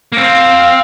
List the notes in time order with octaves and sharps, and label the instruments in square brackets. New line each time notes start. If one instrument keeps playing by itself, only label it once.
[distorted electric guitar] A#3
[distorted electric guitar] C4 [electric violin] F5